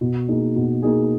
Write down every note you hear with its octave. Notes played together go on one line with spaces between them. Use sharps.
B2
A#3 D#4 G#4
B2
A#3 D#4 G#4